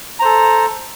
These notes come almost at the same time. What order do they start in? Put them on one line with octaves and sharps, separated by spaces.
A#5 C5 A4